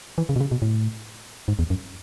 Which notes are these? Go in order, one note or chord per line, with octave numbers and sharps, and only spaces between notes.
E3
C#3
B2
C#3
B2
A2
G#2
E2
F#2